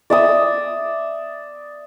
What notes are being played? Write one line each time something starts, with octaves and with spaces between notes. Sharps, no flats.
D5 E5 D#6